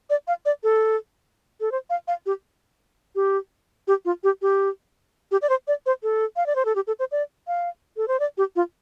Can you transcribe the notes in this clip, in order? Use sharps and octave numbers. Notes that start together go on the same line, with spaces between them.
D5
F5
D5
A4
A4
C5
F5
F5
G4
G4
G4
F4
G4
G4
G4
D5
C5
D5
C5
A4
F5
D5
C5
A4
G4
A4
C5
D5
F5
A4
C5
D5
G4
F4